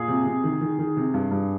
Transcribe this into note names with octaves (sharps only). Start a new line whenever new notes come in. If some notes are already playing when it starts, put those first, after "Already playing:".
Already playing: A#2 G#4
C3
C3
D#3
D#3
D#3
C3
G2
G2